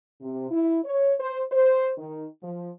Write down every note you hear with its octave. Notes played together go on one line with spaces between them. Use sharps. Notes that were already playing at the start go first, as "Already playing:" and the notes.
C3
E4
C#5
C5
C5
D#3
F3